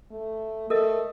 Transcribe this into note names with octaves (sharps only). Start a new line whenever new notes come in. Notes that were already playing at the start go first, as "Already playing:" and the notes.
A3
A3 A4 A#4 D#5